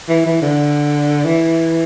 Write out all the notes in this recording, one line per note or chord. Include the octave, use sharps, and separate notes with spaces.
E3
E3
D3
E3